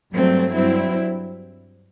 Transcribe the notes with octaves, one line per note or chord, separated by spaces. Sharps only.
G2 F#3 A3 C4
G2 F#3 C4 E4